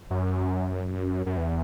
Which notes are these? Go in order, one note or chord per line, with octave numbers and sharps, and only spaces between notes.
F#2
F#2
E2